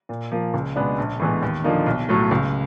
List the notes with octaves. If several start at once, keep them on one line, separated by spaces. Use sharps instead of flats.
A#2
F3 A#3
C#2
B2 G#3 B3 D4
A#1
A2 E3 G#3 B3
D#2
D3 F3 A#3 D#4
B1
A2 F#3 A3
C#2